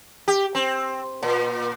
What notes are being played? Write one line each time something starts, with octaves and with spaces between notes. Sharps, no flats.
G4
C4
A#2